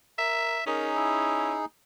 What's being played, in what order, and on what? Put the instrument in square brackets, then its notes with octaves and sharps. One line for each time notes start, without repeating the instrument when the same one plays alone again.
[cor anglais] A#4 [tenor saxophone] E5
[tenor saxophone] C#4 [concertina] D#4 G#4 [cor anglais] A#4
[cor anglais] E4